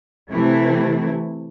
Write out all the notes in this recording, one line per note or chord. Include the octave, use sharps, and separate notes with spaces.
C3 E3 A3 E4